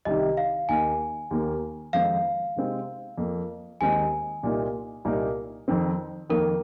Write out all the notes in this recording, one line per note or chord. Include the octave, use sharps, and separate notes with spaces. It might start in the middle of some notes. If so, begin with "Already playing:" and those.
C2 C3 D#3 D#5
F5
D#2 D#3 A#3 D#4 G#5
D#2 D#3 A#3
F2 D#3 G#3 C4 D#4 F5
C3 G#3 C4 D#4
F2 F3 A#3
D#2 D#3 G#3 C4 D#4 G#5
C2 A#2 A#3 D#4
C2 A#2 A#3 D#4
F2 D#3 C4
F2 D#3 A#3 A#4